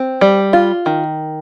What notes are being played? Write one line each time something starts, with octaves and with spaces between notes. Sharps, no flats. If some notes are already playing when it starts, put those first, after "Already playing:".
Already playing: C4
G3
F4
D#3